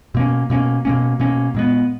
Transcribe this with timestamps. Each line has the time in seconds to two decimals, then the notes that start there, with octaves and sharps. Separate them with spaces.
0.15 B2 A#3 C#4
0.50 B2 A#3 C#4
0.85 B2 A#3 C#4
1.20 B2 A#3 C#4
1.55 A#2 G#3 B3